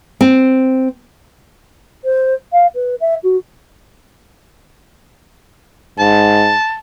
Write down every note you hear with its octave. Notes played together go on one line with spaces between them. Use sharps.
C4
C5
F5
B4
E5
F#4
G#2 A5